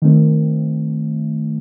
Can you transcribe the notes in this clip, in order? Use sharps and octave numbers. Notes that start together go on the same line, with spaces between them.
D#3 A3 C4